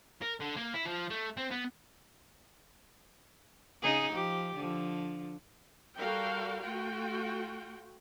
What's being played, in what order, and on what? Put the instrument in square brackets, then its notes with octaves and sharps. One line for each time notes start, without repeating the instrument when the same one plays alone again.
[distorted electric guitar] A#4
D3
A#3
E4
F3
A3
C4
B3
[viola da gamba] C#3 D#4 G#4
F3 G4
D3 F3
[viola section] G3 F#4 A4 A#4 F5 G5
A3 F4 F#4 G5